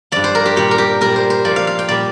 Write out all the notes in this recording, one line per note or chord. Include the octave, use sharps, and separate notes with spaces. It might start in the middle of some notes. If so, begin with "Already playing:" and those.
G2 F3 D5
C5
A#4
G4
A#2 G3 G4
A#4
G4
A#2 G3 A#4
C5
C5
A#2 F3 D5
F5
F5
G5
A#2 G3 D5